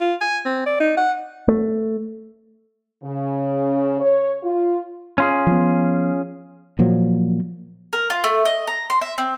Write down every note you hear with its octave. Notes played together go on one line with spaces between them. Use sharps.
F4
G#5
C4
D5
D#4
F#5
A3
C#3
C#5
F4
C#4 F4 G#4
F3 B3
A#2 F3 F#3
A#4
F4
A3
D#5
A#5
C6
E5
C4